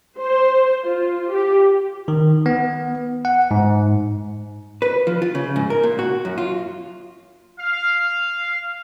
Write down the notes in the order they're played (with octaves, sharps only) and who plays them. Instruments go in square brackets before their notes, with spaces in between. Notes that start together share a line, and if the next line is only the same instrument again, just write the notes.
[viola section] C5
F4
G4
[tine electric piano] D#3
B3
F#5
G#2
[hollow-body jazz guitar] B4
F3
F4
C#3
G#2
A#4
A#2
F#4
F#2
F4
[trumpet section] F5